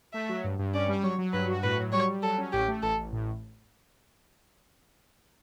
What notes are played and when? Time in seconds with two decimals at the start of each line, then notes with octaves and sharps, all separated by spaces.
0.13 A3 E5
0.29 F#3
0.44 G2
0.59 G2
0.73 C#4 D5
0.88 G3
1.03 F#3 C#5
1.18 F#3
1.33 G2 B4
1.48 F#4
1.63 A2 B4
1.78 F#3
1.93 G3 C#5
2.08 G3
2.23 F#3 A4
2.38 C#4
2.53 A1 G4
2.68 A3
2.83 A1 A4
2.97 A1
3.12 A2